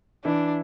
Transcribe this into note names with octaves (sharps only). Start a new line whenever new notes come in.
E3 D4 E4